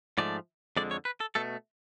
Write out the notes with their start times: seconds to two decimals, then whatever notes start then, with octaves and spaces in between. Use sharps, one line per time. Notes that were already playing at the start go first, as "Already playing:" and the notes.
0.18 G#2 F3 A3 D5
0.77 F2 D3 G#3 D5
0.91 C#5
1.05 B4
1.20 A4
1.35 B2 A3 A4